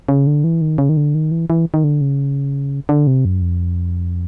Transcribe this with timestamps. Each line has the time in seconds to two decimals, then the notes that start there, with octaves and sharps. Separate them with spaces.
0.09 C#3
0.27 D3
0.44 E3
0.61 D#3
0.78 C#3
0.89 D#3
0.97 D3
1.15 D#3
1.31 E3
1.50 E3
1.74 D#3
1.84 D3
2.01 C#3
2.89 D3
3.07 C3
3.25 F#2
3.42 F2